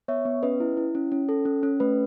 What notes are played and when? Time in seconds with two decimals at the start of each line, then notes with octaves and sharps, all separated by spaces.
0.08 B3 C#5 E5
0.25 B3
0.43 C#4 B4 D#5
0.60 E4
0.77 E4
0.95 C#4
1.12 C#4
1.29 A4
1.45 C#4
1.63 C#4
1.80 A3 B4